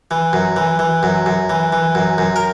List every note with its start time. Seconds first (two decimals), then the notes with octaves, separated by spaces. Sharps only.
0.11 E3
0.33 F#2
0.56 E3
0.79 E3
1.03 F#2
1.26 F#2
1.50 E3
1.72 E3
1.95 F#2
2.18 F#2
2.36 A#4